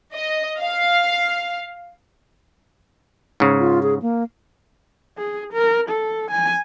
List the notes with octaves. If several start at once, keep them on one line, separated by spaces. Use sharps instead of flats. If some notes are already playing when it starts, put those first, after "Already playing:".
D#5
F5
G#2 C#3
F4
G#4
A#3
G#4
A#4
A4
G#5